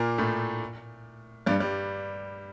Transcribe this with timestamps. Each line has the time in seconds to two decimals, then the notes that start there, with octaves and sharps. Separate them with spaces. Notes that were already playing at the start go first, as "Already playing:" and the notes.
Already playing: A#2 A#3
0.18 A2 A3
1.46 G2 G3
1.60 G3